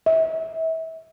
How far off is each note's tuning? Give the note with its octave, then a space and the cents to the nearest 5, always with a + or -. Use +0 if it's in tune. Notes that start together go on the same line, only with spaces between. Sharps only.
E5 -30